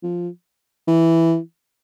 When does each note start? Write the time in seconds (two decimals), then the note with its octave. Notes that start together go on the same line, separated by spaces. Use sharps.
0.03 F3
0.88 E3